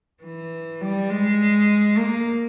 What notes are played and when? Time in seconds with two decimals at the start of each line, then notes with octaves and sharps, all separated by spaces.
0.23 E3
0.81 G3
1.10 G#3
1.98 A#3